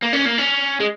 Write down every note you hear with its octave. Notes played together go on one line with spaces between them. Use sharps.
A#3
C#4
A#3
C#4
G#3